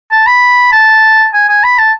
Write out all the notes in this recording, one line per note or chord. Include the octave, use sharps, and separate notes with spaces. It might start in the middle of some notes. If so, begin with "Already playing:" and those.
A5
B5
A5
G#5
G#5
B5
A5